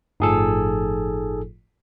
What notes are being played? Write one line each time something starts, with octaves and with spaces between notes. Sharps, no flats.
G1 A2 F3 D#4 G#4 A4